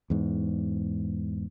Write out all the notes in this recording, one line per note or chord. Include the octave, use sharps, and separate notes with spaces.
E2 G#2